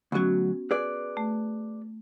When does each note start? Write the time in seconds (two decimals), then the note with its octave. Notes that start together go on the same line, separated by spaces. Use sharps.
0.12 D2 F#3 B3 C#4 F#4
0.71 G#4 B4 D5
1.17 A3